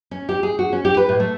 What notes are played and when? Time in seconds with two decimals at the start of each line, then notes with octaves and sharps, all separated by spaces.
0.11 C#4
0.29 G4
0.43 G#4
0.59 F#4
0.73 C#4
0.85 G4
0.97 B4
1.09 A2
1.20 A3